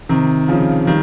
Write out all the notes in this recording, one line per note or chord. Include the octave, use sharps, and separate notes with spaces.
C3 D#3
C#3 F3
D#3 G3